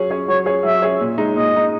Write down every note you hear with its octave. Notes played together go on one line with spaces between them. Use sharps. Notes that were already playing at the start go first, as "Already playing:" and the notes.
Already playing: F#3 C#4 G#4 C#5
C#4 G#4 C#5
F#3 C#5
C#4 G#4 C#5
F#3 E5
C#4 G#4 C#5
A#2
G#3 D#4
A#2 D#5
G#3 D#4